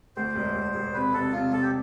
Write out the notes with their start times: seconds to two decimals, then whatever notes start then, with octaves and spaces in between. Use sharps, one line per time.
0.16 D2 C5
0.35 E1
0.56 E1
0.74 E1
0.94 C3 B4
1.13 C3 A4
1.32 C3 F4
1.51 C3 A4
1.62 G4